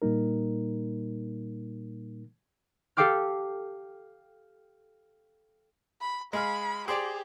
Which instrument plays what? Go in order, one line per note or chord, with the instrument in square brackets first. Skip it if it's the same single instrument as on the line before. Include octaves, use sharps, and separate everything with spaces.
[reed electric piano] A#2 G3 A#3 D#4 A#4
[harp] G4 A4 F5 G5 D6 F6
[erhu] B5
[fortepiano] G#3 G#4 F5 [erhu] B5
[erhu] G4 [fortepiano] G#4 C5 D5